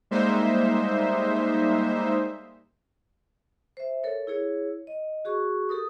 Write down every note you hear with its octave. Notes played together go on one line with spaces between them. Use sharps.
G3 G#3 A#3 D#4 C5 E5
C5 E5
A4 A#4 C#5
E4 G#4 C#5
D#5
F#4 G#4 C#6
G4 A4 A#4 D#6